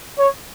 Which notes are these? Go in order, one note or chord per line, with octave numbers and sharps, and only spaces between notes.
C#5